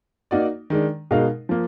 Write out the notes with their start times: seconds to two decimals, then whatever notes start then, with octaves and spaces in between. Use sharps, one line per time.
0.31 A#3 D#4 F#4 D5
0.70 D#3 G#3 D4
1.11 B2 G#3 D#4 A#4 F5
1.49 F3 A#3